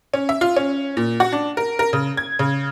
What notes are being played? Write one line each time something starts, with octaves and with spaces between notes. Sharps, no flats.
C#4
E5
F4
C#4
A#2
F#4
D4
A#4
A#4
C#3
G#6
C#3